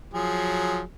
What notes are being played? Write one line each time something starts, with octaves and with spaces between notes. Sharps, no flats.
F3 F#3 G#4